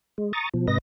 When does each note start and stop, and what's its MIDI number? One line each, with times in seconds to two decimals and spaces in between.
0.18 0.32 56
0.33 0.49 82
0.33 0.49 85
0.33 0.49 87
0.33 0.49 93
0.54 0.67 47
0.54 0.67 53
0.67 0.78 44
0.67 0.78 48
0.67 0.78 71
0.67 0.78 75
0.67 0.78 94